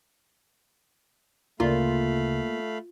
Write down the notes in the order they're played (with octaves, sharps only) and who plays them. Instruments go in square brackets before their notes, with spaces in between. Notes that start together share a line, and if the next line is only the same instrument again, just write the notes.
[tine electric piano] D2 C#3 [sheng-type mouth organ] A3 F5 B5 [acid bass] A#3 [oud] F4